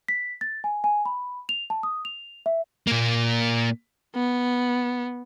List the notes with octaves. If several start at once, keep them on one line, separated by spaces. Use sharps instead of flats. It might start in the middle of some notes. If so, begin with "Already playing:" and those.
B6
A6
G#5
G#5
B5
F7
A5
D#6
F7
E5
A#2 A#3
B3